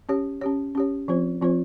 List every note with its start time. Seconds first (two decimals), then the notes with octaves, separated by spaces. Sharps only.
0.09 C#4 G4 C#5
0.41 C#4 G4 C#5
0.75 C#4 G4 C#5
1.08 F3 C4 F4 C5
1.41 F3 C4 F4 C5